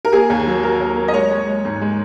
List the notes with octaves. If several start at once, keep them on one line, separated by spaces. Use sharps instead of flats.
A#4
A#3 G#4
D#2
F#3
F#3 A#4
D#2
A#3
D#5
G#3 C#5
G#3
G#3
G#2
G#3